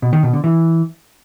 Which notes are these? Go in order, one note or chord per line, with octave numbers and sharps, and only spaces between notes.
B2
D#3
B2
D3
E3